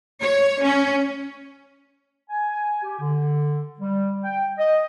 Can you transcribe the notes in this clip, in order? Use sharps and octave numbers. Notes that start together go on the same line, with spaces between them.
C#5
C#4
G#5
G4
D3
G3
G5
D#5